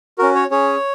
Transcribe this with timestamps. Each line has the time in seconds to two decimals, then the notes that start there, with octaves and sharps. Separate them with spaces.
0.19 C#4 F#4 A#4
0.35 C#5
0.50 C#4 G#4 C#5